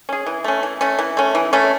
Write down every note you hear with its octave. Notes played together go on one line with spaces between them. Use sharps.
C#4 G#4
E3
A3 C#4
E3
A3 C#4
E3
A3 C#4
E3
A3 C#4